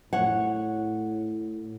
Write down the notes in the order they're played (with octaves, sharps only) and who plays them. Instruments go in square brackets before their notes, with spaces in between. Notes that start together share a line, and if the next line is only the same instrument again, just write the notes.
[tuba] A2 [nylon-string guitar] C#5 F#5